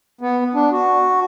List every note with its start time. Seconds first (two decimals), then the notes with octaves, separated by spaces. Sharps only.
0.21 B3
0.55 D4
0.72 F#4